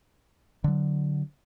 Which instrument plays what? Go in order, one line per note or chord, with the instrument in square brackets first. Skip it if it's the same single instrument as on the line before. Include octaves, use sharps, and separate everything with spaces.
[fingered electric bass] D3 F#3